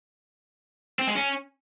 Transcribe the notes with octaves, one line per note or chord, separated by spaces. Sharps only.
C4
G#3
C#4